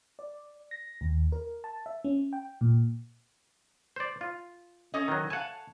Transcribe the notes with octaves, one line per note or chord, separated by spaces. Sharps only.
D5
A#6
D#2
A#4
A5
E5
C#4
G5
A#2
C5 D5
F4
C#4 A4 D#5
D#3 F#3
F5 F#5 G#5 A5